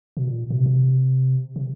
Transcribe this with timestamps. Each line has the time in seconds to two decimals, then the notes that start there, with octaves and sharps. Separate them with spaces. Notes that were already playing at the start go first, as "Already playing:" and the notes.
0.17 B2
0.28 A#2
0.50 B2
0.58 C3
0.66 B2
0.73 C3
1.56 C3